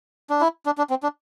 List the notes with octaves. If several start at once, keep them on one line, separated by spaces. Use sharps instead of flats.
D4
E4
D4
D4
C4
D4